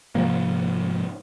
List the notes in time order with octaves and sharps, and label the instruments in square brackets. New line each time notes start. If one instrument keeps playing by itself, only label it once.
[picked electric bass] G#2 C3 F3 A#3